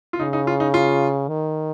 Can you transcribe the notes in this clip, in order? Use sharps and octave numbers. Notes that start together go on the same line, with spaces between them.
F4
C#3 D#4
D#4
F4
D#4
F4
D#3